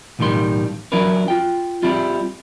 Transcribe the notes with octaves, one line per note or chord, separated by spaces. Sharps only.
B1 A2 D#3 G3 C6
F#3 C#4 D4 E4 A#4 B4
F4 G5
G3 C4 E4 F4